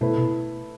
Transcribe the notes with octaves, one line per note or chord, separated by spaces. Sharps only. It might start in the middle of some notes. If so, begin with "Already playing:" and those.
B2 A3 E4 B4
B2